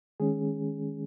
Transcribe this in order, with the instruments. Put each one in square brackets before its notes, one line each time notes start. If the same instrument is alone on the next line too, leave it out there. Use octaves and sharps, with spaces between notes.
[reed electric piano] D#3 G#3 C#4 G#4